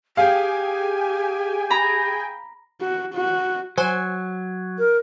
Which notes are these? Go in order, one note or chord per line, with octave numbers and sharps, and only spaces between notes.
G4 G#4 F5 G5 G#5
A#5 B5
F#4
F#4
F#3 C5 G#5
A#4